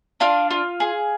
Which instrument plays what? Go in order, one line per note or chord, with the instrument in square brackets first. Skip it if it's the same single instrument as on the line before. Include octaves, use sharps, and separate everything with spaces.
[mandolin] D4 F4 F5
F4
G#4